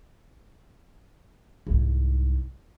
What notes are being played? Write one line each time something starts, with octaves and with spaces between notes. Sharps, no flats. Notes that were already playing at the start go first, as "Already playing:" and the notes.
C2 G#2